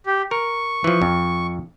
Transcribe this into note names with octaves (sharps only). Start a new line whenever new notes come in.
G4
A#4 C#6
E3 F3
F2